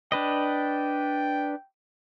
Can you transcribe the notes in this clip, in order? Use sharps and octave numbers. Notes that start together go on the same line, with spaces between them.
D4 B4 D#5 G5